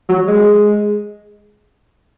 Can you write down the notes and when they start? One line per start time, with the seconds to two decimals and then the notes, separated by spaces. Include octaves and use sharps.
0.09 F#3
0.27 G#3